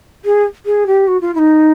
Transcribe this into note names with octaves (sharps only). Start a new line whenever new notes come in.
G#4
G#4
G4
F#4
F4
E4
D#4